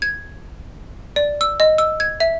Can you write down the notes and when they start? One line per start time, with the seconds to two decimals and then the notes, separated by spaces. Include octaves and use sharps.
0.02 G#6
1.16 D5
1.41 E6
1.60 D#5
1.78 E6
2.00 G#6
2.20 E5